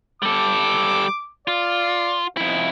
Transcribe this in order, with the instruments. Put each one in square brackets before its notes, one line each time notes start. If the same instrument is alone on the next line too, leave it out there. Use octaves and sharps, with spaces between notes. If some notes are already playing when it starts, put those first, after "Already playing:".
[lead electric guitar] G3 A4 [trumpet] D6
[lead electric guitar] F4 [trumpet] D5
[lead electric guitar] F2 E4 [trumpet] D#4